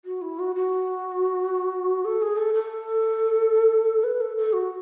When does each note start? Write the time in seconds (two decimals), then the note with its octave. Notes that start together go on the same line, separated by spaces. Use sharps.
0.05 F#4
0.21 E4
0.39 F#4
0.55 F#4
2.04 A4
2.22 G#4
2.37 A4
2.54 A4
4.03 B4
4.21 A4
4.37 A4
4.53 F#4